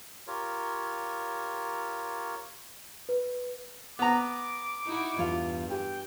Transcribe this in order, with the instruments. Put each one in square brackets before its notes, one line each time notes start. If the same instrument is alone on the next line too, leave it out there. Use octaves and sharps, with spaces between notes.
[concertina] F4 G4 A#4 C#5
[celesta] B4
[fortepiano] B3 A#5 [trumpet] D6
[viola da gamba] D#4 E4 F#4
[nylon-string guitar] E2 F4 F5 [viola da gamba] G2
[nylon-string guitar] G4 G#5 [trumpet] G5